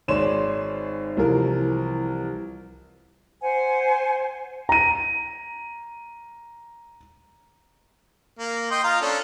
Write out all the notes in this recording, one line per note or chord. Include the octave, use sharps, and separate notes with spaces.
G#1 G#3 C#5 D5 C6 E7
C2 E3 F3 A#4
C5 F#5 G#5
A#5 D#7
A#3
D#5 G5 C6
F4 F5 A#5
C#4 D4 A4